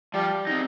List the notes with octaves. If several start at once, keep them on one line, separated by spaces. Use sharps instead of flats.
F3 G3
C4 D#4